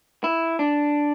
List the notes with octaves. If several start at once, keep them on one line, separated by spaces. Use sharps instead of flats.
E4
D4